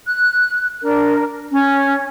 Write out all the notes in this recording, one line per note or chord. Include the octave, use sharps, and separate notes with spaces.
F#6
D4 A#4
C#4